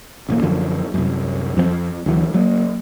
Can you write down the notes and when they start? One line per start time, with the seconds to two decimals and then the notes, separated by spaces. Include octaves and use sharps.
0.29 E1 A1 A#3
0.43 F#2 D3 F3
0.94 C2 F#2
1.57 F2 F3 A3 C4
2.06 D2 E3 F#3
2.34 F#3 A#3